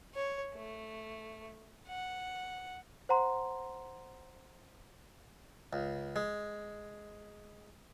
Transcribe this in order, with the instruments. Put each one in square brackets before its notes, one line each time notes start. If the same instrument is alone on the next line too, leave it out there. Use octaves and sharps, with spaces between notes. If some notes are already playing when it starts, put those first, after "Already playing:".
[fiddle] C#5
A3
F#5
[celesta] C5 F#5 A#5 C6
[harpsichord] C#2
G#3